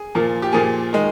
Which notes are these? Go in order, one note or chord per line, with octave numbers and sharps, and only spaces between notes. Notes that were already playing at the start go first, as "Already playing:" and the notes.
Already playing: G#4
A#2 F3 A#3
G4
A#2 F3 A#3 G#4
D#3 G#3